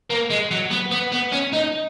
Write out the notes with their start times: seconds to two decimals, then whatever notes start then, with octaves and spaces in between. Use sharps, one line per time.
0.10 A#3
0.30 G#3
0.51 F#3
0.71 B3
0.92 B3
1.12 B3
1.32 C#4
1.53 D#4